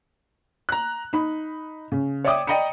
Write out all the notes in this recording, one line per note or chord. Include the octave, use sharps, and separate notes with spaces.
A#5 F#6
D#4 B5
C#3
C#5 D5 E5 G5 D6 D#6
D5 D#5 G5 A#5 B5 C#7